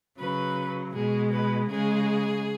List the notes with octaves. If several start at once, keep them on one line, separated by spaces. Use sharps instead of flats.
C#3 F#3 B4
B2 G#3 G#4
B4
C#3 G#3 G#4